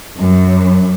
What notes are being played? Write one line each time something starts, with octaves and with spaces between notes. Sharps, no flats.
F#2